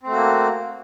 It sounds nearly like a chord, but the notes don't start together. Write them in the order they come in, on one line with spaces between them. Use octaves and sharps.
C4 A3 F#4 A#3